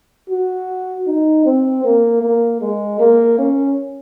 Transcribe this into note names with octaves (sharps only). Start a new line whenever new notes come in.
F#4
D#4
C4
A#3
A#3
G#3
A#3
C#4